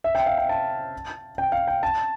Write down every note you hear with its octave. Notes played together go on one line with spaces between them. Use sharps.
E5
G5
F5
G5
A5
G5
F5
G5
A5